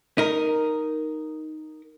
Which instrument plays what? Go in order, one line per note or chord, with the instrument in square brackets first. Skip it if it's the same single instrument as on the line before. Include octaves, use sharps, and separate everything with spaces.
[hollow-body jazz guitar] D#4 A#4